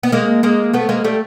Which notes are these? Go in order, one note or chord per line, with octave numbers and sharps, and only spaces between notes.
B3
G#3 A#3
G#3 A#3
A3 B3
G#3 A#3
G3 A3